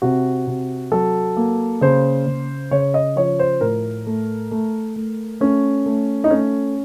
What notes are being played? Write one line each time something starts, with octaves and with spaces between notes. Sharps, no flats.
C3 F#4
C3
F#3 A4
A#3
C#3 C5
C#3
C#3 C#5
D#5
F3 C#5
C5
A2 A#4
A3
A3
A3
A3 C#4
A3
D#4
A3 C#4